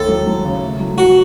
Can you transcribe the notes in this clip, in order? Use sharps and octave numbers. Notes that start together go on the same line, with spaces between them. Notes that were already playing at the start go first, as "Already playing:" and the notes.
Already playing: D#2 A3 A4
F#3
F#3
C#3
A3
F#3
F#3 F#4